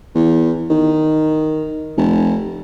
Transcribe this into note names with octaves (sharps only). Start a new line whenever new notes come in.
E2
D#3
F1